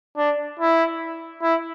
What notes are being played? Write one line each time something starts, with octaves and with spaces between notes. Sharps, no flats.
D4
E4
E4